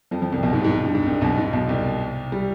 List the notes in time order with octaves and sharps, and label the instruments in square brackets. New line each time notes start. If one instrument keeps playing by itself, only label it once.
[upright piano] F2 F3
F2 F3
C2 C3
B1 B2
G#2
G#2
G2
G#2
C2 C3
B1 B2
G#2
B1 B2
C2 C3
G3